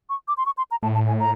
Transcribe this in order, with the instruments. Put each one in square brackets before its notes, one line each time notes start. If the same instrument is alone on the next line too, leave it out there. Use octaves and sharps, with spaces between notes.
[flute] C#6
D6
C6
C#6
C6
A#5
[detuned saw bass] A2 [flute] A5
[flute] A5
G#5
A#5